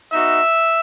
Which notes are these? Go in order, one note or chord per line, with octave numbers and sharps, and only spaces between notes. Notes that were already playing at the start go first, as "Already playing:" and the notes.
B3 D#4 F#4 E5